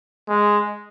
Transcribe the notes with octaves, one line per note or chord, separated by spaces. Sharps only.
G#3